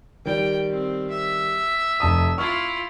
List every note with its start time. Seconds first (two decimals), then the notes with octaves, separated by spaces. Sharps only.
0.25 D#3 G3 G5
0.71 C4
1.10 E5
2.00 F1 A5 D#6
2.38 E4 F4 C#6 F6